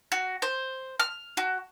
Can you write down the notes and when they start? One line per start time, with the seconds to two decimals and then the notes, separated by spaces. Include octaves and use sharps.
0.12 F#4
0.42 C5
1.00 F6
1.37 F#4